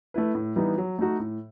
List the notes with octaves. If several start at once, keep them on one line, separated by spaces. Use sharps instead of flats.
A3 E4 B4
A2
E3 G3 B3 D#4
F#3
A3 D#4 F#4
A2